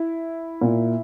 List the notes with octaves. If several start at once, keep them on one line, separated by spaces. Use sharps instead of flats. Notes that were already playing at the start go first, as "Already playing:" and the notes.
Already playing: E4
A#2